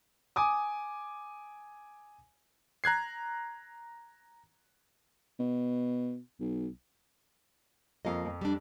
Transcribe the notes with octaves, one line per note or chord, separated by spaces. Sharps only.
G#5 D6 D#6
A#5 F#6 G#6 C7
B2
B1
F2 F3 A#3 D#5 F5
F2
G3 D4